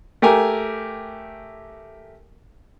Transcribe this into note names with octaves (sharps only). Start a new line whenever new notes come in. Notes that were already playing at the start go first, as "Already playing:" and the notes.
A3 G4 A#4 G#5